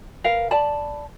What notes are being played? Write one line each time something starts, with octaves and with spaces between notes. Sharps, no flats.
A#4 B4 F5
D5 A5 B5